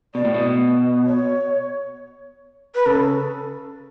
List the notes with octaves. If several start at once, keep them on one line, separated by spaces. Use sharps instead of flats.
B2 D5
A2
B2
C#5
B4
C#3 A4